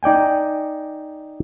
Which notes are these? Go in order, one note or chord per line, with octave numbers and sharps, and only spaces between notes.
D#4 D5 G5 G#5